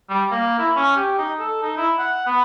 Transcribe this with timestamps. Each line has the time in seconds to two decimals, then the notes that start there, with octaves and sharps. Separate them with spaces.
0.10 G3
0.31 A#3
0.59 E4
0.76 C#4
0.96 G4
1.18 D#4
1.39 A4
1.62 D#4
1.77 E4
1.98 F#5
2.26 B3